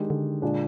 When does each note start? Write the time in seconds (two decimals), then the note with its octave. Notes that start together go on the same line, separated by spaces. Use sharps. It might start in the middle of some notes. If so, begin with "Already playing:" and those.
Already playing: D#3 G#3 D4 G4
0.10 D3
0.42 A#2 G#3 D4 G#4